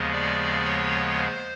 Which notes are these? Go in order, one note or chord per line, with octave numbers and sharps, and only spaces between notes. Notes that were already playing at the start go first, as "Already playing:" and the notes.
Already playing: D#2 C#3 F3 G#3 B3
D5
C#5
C5